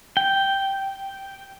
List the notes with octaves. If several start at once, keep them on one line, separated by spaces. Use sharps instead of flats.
G5